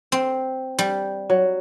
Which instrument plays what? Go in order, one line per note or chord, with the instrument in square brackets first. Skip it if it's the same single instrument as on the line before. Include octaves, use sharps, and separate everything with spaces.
[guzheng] C4
G3
[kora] F#3